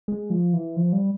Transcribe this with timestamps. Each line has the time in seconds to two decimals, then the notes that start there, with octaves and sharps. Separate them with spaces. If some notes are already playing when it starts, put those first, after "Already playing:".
0.08 G#3
0.30 F3
0.53 E3
0.76 F3
0.93 G3